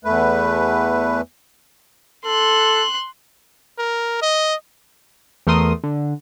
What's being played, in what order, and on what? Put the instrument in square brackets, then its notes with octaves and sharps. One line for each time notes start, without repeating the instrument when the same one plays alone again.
[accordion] E2 A3 B4
[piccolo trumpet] A4 [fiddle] C6 F#6
[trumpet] A#4
D#5
[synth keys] E2 A3 A#4 C6 D#6
D3